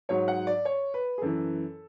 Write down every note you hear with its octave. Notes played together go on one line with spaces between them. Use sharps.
G#2 F#3 C#5
F#5
D5
C#5
B4
G#4
F#2 E3 A4